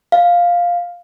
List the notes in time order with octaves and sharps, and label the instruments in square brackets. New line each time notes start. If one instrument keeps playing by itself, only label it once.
[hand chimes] F5